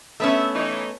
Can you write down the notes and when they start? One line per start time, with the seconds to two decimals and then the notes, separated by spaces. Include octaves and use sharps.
0.20 A3 B3 C#4 E5
0.54 E3 D#4 C#5